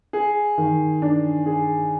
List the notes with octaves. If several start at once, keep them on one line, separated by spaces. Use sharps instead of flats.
G#4
D#3
D4
G#4